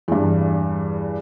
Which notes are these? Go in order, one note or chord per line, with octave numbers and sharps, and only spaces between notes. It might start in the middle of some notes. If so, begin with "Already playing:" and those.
E2 G2